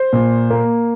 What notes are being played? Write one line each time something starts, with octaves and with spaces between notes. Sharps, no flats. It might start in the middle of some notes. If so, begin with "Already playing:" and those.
Already playing: C5
A#2
A#3